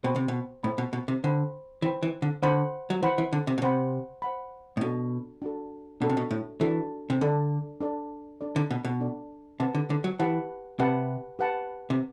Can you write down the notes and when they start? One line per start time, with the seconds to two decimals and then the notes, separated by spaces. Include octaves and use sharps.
0.04 B2 C5 G5 B5
0.16 C3
0.28 B2
0.64 A2 C5 G5 B5
0.78 B2
0.93 B2
1.08 C3
1.24 D3 C5 G5 B5
1.82 E3 C5 G5 B5
2.03 E3
2.22 D3
2.43 D3 C5 F#5 B5
2.90 F#3
3.02 E3 C5 F#5 B5
3.18 E3
3.33 D3
3.47 C3
3.58 B2
3.62 C3 C5 F#5 B5
4.22 C5 F#5 B5
4.77 A2
4.81 B2 D4 F#4 A4
5.42 D4 F#4 A4
6.01 B2 D4 F#4 A4
6.10 C3
6.17 B2
6.31 A2
6.61 E3 D4 F#4 A4
7.10 C3
7.21 D3 D4 A4 D5
7.81 D4 A4 D5
8.41 D4 A4 D5
8.56 D3
8.71 B2
8.85 B2
9.00 D4 A4 D5
9.60 C3 G4 B4 F#5 A5
9.75 D3
9.90 D3
10.04 F#3
10.19 E3 G4 B4 F#5 A5
10.79 C3 G4 B4 F#5 A5
11.39 G4 B4 F#5 A5
11.90 C3